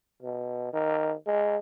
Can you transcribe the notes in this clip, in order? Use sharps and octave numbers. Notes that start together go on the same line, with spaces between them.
B2
D#3
G#3